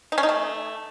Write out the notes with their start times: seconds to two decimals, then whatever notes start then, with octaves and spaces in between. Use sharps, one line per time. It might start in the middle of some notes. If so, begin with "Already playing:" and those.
0.12 D#4
0.18 C#4
0.23 D#4
0.29 A3